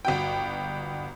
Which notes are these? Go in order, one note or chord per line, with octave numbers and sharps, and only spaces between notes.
G1 F#4 G5